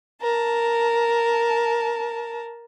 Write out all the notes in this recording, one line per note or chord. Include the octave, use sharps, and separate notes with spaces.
A#4 A5